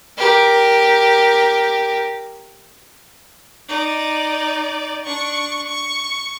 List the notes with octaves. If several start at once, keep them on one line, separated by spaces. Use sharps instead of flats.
G4 A#4
D#4 D5
D4 C#6
C#6